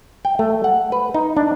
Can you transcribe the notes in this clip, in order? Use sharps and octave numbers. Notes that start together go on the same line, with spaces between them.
G5
A3
F#5
B4
D#4
D4